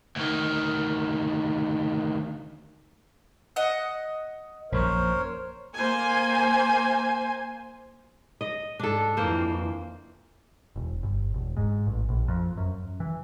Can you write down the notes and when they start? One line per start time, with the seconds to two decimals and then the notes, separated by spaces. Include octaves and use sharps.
0.16 D2 D#3
3.56 D#5 F#5
4.72 A#1 F#2 A#4 C5 C#5
5.75 A#3 C5 G#5
8.41 D#5
8.80 G#2 D4 A4
9.17 F2 E3 A#3 C5
10.76 E1
11.03 G1
11.34 E1
11.57 G#2
11.87 A1
12.09 A#1
12.28 F2
12.57 F#2
13.00 E3